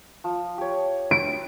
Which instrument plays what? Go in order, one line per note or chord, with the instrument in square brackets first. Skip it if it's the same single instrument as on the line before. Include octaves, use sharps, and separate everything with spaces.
[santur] F3
G4 C#5
[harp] D7